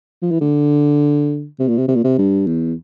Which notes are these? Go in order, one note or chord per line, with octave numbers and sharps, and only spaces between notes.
F3
E3
D3
C3
A#2
C3
C3
A#2
C3
G2
E2